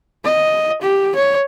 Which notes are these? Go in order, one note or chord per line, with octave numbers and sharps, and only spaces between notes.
D#5
G4
C#5